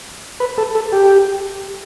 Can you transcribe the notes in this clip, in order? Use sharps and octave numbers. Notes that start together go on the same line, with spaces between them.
B4
A4
A4
G4